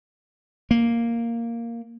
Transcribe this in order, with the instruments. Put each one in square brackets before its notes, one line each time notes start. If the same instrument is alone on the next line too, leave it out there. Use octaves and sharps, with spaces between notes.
[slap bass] A#3